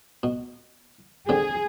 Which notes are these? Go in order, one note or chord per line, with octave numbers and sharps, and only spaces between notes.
B2
D3 C4 G4 G#4